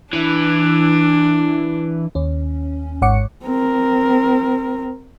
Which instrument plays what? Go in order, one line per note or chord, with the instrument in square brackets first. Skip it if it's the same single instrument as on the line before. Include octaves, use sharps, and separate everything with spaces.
[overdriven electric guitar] E3 [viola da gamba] D4
[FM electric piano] D#2 C#4
G#1 G#2 C#5 F#5 D6 C#7
[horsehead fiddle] C4 A#4